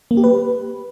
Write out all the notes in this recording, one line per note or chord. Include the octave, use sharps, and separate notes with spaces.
A#3
G4
B4